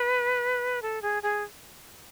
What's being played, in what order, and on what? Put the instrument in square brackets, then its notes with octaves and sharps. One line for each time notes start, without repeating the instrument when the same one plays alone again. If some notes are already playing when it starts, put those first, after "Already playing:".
Already playing: [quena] B4
A4
G#4
G#4